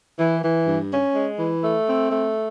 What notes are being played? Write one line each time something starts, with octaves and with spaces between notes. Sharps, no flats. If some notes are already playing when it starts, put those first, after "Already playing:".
E3
E3
G2
C#4
G#3
E3
A3
C4
A3